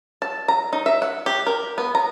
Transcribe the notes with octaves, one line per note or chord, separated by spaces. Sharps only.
A5
A#5
D#4
E5
F#5
G4
A#4
B3
A#5